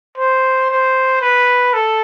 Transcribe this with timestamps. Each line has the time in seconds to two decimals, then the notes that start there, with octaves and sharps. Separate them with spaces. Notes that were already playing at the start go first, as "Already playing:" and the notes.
0.18 C5
0.70 C5
1.21 B4
1.74 A4